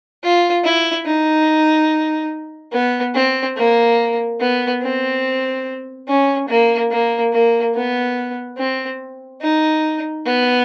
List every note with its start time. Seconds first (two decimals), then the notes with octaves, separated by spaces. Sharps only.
0.23 F4
0.64 E4
1.05 D#4
2.72 B3
3.15 C4
3.57 A#3
4.40 B3
4.82 C4
6.08 C#4
6.48 A#3
6.91 A#3
7.32 A#3
7.74 B3
8.57 C4
9.41 D#4
10.25 B3